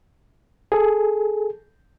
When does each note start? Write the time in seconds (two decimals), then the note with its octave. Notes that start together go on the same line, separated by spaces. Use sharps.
0.72 G#4 A4